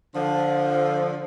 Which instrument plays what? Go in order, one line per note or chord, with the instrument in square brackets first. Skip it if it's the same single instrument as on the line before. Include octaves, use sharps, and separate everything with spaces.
[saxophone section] D3 F3